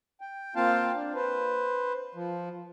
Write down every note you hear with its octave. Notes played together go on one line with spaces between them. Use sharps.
G5
A#3 C4 F4 F5 G5 A5
D4
B4 C5
F3